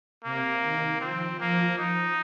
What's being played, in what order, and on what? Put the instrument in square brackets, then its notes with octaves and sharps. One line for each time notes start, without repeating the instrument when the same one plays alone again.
[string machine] C3 [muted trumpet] A#3
[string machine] D#3
[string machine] F3 [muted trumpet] C4
[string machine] F3 [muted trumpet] A#3
[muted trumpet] D#4